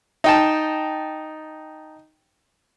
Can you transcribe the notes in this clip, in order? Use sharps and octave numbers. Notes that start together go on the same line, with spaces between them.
D#4 G5 A5